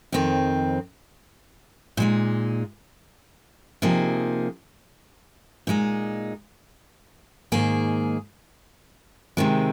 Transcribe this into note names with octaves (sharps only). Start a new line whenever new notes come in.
F2 D#3 C4
A#2 G#3 D#4
C3 F3 A#3 D#4 G#4
A#2 G#3 D#4
G#2 D#3 A#3 G#4
C3 D#3 G#3 C4